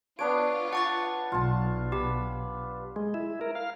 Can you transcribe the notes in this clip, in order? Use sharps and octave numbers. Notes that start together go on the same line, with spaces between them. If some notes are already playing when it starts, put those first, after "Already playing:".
B3 D4 F4 C#5 D7
F#5 A5 C#6 A6
B1 F4 A5
G4 B5
G#3
E4
A#4
F5